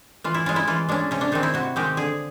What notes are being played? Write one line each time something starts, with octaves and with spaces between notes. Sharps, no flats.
E3 F4
E4
G#3 C#4 F4
E4
E3 F4
G#3 C#4 D4
C3 C#4
D4
D#3 G#3 C4 D#4
E4
C3 F#4
D#3 G#3 C4 G4
D3 G#4